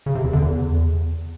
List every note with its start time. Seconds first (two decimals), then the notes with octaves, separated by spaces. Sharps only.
0.06 C#3
0.15 C3
0.24 E2
0.33 D3
0.42 E2